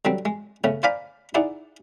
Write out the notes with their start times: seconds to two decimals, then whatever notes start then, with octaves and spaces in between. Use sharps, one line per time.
0.05 D3 F#3 G3 C4
0.25 G#3
0.64 C#3 A3 B3 C#4
0.83 C5 D5 F5 G#5 A#5 B5
1.35 D#4 E4 G#4 D5 F#5